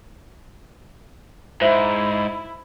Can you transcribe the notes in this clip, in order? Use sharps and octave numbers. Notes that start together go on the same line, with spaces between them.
G#2 E4 F4 C5 E5